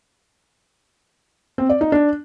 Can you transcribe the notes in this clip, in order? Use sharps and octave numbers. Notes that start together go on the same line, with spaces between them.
C4
D5
D#4
D4